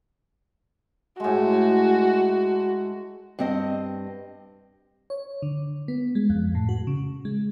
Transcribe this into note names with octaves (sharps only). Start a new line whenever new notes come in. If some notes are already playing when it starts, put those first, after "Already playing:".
A2 G#3 F#4
G2 C4 D#5
C#5
D3
B3
G#3
F2
A2
F#4
C#3
G#3